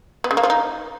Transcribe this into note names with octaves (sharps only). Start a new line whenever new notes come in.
B3
C#3
A#3
F3
D#4